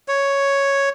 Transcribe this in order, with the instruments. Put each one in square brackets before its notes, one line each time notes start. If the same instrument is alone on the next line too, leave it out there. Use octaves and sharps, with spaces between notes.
[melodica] C#5